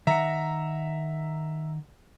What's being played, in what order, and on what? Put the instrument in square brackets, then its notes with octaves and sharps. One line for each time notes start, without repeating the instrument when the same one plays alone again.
[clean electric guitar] D#3 D#5 F#5 [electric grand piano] E5 A#5